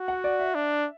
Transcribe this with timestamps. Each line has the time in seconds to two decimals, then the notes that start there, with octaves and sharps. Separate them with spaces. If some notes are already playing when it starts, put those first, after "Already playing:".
Already playing: F#4
0.08 F#5
0.24 D5
0.40 E5
0.55 D4